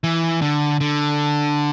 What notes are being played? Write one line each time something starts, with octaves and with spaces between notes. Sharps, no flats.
E3
D3
D3